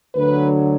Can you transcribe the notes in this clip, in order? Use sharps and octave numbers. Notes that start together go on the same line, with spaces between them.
D2 D3 F#3 B4